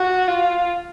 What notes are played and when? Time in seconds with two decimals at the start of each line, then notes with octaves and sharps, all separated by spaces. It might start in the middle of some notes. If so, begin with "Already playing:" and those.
Already playing: F#4
0.28 F4